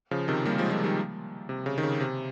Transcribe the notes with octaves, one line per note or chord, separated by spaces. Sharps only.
C#3 F3
C3 D#3
G3 A#3
F3 G#3
F3 G#3
D#3 G3
C3
C#3
D#3
C#3
C3